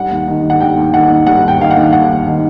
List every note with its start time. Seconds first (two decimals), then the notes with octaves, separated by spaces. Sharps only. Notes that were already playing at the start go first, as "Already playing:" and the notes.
Already playing: G3 F#5
0.11 D#2
0.27 D#3
0.44 D#2
0.50 F#5
0.60 G3 G5
0.77 D#2
0.93 D#3 F#5
1.10 D#2
1.26 G3 F#5
1.43 D#2 G5
1.59 D#3 F5
1.71 F#5
1.76 D#2
1.93 G3 F#5
2.09 D#2
2.26 D#3